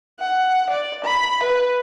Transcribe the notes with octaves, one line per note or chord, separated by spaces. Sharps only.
F#5
D5
B5
B4